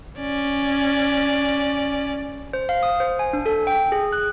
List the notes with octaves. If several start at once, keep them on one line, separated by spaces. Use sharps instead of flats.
C#4 D5
C5
F5
D#6
C5
G#5
D4
A4
G5
G#4
F#6